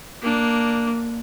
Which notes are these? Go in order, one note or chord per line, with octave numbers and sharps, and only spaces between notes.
A#3 D4